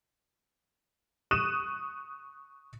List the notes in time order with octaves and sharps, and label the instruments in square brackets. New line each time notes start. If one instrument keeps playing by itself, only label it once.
[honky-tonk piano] C#6 D#6 F#6 D#7 E7